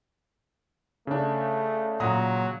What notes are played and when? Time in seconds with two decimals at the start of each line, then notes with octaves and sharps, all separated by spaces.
1.07 C#3 A3 D4
2.00 A#2 F#3 A#5 D#6